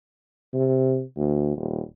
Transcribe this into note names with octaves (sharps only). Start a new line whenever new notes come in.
C3
D2
D#1